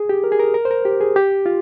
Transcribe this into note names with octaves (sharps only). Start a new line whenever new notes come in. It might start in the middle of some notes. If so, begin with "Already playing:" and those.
Already playing: G#4
G4
A#4
G#4
A#4
A#4
C5
A#4
G4
G#4
G4
F4